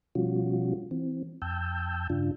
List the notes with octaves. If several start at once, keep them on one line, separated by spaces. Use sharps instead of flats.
B2 F3 G3 C#4 F4 F#4
E3 C4
F2 G5 A5 E6 G6
G2 C#3 D4 F4